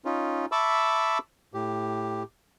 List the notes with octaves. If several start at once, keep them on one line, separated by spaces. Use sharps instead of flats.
C#4 D#4 F4
E5 A5 B5 C#6 D6 E6
A2 G4